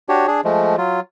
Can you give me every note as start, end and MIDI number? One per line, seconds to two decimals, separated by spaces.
0.09 0.27 62
0.09 0.27 66
0.09 0.27 67
0.09 0.27 73
0.27 0.41 62
0.27 0.41 68
0.44 0.76 53
0.44 0.76 56
0.44 0.76 57
0.78 1.00 54
0.78 1.00 65